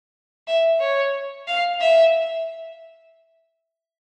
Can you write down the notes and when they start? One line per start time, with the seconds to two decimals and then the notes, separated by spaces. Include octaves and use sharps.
0.48 E5
0.80 C#5
1.48 F5
1.81 E5